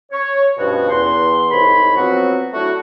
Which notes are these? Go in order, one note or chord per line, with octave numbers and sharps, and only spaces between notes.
C#5
G2 B2 F3 C#4 F#4
E2 C6
C2 G#2 C#5 B5
F3 F#3 B3 C4 F#4
F#3 A3 D4 E4 F#4